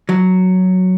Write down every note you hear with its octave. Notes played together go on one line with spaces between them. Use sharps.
F#3